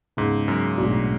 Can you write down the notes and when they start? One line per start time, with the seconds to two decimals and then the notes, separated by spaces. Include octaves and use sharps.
0.17 C#2 G#2 C#3 G#3 B3
0.48 F#2
0.78 B1 A2 G#3 D4 F#4